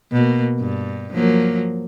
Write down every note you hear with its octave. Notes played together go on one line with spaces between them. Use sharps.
B2 A#3
G2
F3 F#3 A#3